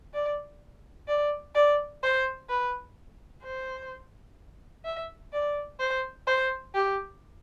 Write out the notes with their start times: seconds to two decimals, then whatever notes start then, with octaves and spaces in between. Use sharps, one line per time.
0.14 D5
1.08 D5
1.55 D5
2.03 C5
2.49 B4
3.43 C5
4.85 E5
5.33 D5
5.79 C5
6.27 C5
6.74 G4